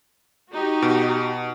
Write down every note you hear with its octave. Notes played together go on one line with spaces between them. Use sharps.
D#4 F#4 G4
B2